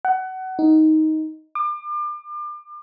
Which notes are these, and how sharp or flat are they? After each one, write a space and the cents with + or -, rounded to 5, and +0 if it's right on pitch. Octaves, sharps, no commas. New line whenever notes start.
F#5 +25
D#4 +10
D6 +35